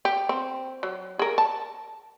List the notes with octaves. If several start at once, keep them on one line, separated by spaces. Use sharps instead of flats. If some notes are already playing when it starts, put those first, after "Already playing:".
G4
C4
F#3
G#4 A#4
A5